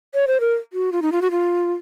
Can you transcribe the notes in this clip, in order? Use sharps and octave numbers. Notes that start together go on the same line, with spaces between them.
C#5
C5
A#4
F#4
F4
D#4
F4
F#4
F4